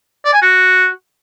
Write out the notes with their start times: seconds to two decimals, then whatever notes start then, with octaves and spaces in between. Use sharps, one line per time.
0.25 D5
0.33 G#5
0.42 F#4